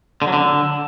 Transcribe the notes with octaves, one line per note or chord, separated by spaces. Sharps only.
D3
F#3
D3